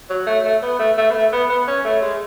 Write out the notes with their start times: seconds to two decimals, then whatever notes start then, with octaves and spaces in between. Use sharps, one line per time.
0.09 F#3
0.27 A3
0.45 A3
0.62 B3
0.79 A3
0.97 A3
1.10 B3
1.14 A3
1.32 B3
1.49 B3
1.67 C#4
1.85 A3
2.02 G#3